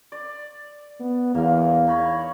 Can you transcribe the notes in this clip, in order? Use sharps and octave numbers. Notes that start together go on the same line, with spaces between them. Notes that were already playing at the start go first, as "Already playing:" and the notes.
D5
B3
E2 A#3 F5
D#4 C#5 B5